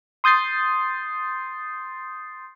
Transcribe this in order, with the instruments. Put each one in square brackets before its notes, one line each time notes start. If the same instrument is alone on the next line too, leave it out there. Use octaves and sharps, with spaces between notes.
[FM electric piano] C6 D#6 G6 A6 C7